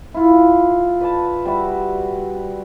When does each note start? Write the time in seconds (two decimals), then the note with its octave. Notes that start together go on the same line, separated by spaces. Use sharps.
0.14 E4 F4
1.00 B4 D5 A5
1.45 G3 F#4 D5 E5